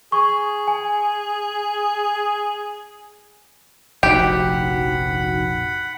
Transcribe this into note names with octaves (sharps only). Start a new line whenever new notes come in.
G#4 C#6
G#5
F1 A#1 D#4 F#4 G4 F#5 B5